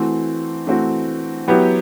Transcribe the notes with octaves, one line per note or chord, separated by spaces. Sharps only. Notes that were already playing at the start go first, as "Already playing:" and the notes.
Already playing: E3 A3 C4 F#4
E3 A3 C4 F#4
F#3 B3 E4 G4